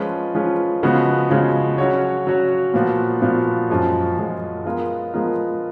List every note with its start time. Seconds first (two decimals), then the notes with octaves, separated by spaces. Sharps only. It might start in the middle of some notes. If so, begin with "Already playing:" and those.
Already playing: F3 G#3 C#4 F4 B4
0.35 F3 G#3 C#4 F4 B4
0.83 C#3 F3 G#3 B3 F#4
1.30 C#3 F3 G#3 B3 F#4
1.78 F#3 C#4 F#4 C#5
2.27 F#3 C#4 F#4 C#5
2.74 A#2 F3 B3 F#4
3.22 A#2 F3 B3 F#4
3.70 F#2 F3 G#3
4.17 F#2 F3 G#3
4.65 F3 G#3 B3 F4 A#4
5.14 F3 G#3 B3 F4 A#4